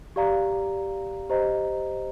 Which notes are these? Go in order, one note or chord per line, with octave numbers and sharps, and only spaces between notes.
G4 D5 F5 A#5
G4 C5 D#5 A#5